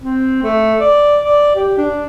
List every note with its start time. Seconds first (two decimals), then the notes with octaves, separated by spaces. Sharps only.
0.02 C4
0.43 A3
0.80 D5
1.22 D5
1.55 G4
1.77 D4